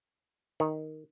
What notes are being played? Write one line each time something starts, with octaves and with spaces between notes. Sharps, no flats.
D#3